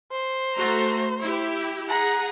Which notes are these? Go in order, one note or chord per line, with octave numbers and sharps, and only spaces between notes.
C5
A3 F#4 A#5
E4 G4
G#4 F#5 A#5